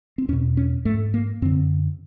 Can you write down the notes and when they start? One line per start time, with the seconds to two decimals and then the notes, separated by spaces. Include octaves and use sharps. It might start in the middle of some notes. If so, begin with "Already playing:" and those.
0.18 C4
0.28 E2 C#4
0.33 B2
0.57 C#4
0.85 G#2 A3
1.14 A#3
1.42 F#2 D3 C4